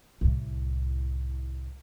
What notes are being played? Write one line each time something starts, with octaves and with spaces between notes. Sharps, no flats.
C2 A2